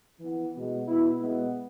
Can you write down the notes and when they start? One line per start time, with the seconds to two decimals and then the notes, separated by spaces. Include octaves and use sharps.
0.20 E3 B3
0.54 B2 G#3 B3
0.87 B2 B3 E4
1.20 B2 G#3 B3